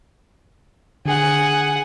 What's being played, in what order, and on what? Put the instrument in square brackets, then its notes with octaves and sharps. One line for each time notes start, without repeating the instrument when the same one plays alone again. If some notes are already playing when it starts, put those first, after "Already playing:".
[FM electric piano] D3 [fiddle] G#4 F#5